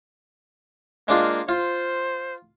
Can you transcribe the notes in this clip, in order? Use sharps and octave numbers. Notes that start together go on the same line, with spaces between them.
G#3 A#3 D4 F4
F4 C5